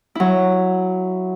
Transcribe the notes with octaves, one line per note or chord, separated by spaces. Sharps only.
F#3 E4